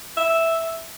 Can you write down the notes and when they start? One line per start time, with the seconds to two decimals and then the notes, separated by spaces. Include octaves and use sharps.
0.17 E5